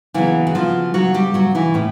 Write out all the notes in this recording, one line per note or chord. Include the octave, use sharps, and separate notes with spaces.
C#3 E3 F#3 B3 E4
F#4
F3 F4
F#3 F#4
G3 G4
F#3 F#4
E3 E4
A2 C#4